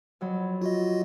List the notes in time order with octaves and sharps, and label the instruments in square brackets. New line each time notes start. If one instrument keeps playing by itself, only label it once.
[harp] F2 F#3 B5
[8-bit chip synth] F4 F#4 D#5